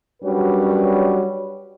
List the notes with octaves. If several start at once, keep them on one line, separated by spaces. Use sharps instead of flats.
F#2 G3 D4 F#4 B4 C#5